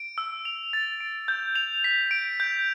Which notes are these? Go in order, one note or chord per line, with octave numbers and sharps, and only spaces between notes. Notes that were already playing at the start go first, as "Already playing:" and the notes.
Already playing: D7
E6
F7
A6
D7
G6
F7
B6
D7
G6